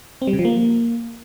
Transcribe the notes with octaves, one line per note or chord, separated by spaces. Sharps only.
C4
G3
C#3
F3
A#3